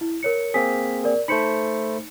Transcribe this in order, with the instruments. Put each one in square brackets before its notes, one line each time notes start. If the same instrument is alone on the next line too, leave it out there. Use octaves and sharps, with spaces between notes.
[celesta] E4
A#4 C#5 C#7
[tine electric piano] A#3 C4 G#4 [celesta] B6
[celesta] A#4 D5
[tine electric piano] A3 C5 B5 [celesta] D#4 C#7